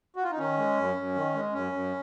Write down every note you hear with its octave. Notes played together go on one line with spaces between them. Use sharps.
F#4
F4
D#4
D#3 C#4
G#3
F#2
F#2
D#3
G#3
F#2 C#4
F#2